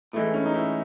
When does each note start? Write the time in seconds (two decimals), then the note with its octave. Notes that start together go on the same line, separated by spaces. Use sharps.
0.13 A2 E3 G#3 A3
0.34 C#4
0.45 D#4
0.54 E4